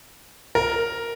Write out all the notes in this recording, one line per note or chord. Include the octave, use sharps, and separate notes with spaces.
A#4